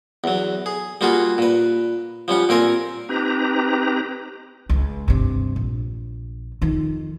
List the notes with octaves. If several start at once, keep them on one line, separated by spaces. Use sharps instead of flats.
E2 F#3
G#4
G3 A#3 F4 F#4 G#4
A#2 B4
F3 G3 C#4 F#5
A#2 C4 A#4 G#5 C6
C4 D#4 G4 B4 A#5
C#2
G2 C3
A#1
F2 D#3